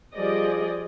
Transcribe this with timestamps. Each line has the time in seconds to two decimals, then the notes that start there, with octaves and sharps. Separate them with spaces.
0.16 F3 G3 G#4 D5 D#5